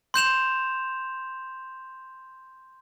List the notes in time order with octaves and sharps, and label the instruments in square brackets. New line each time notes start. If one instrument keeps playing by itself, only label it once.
[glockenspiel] C6 G6 E7 F7